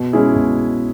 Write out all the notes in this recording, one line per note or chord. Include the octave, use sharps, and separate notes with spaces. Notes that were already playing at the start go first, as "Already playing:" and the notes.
Already playing: B2
G#3 C#4 E4 G#4
B2